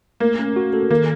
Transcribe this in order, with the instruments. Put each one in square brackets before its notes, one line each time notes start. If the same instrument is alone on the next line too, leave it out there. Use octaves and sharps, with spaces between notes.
[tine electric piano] A3 [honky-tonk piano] A#3
[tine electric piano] C#4
F#4
A4
[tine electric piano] D#3 [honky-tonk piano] A#3